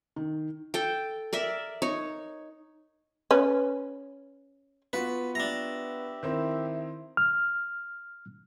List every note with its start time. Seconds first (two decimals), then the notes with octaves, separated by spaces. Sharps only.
0.16 D#3
0.74 A4 G5
1.33 A#4 D5 E5
1.82 D#4 C#5
3.31 C#4 B4
4.93 B3 F4 F#4 B4
5.35 D4 G4 E5 A#5
6.23 D#3 C4 E4
7.17 F6